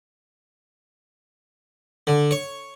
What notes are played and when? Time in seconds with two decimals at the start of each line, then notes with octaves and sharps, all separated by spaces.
2.07 D3
2.31 C#5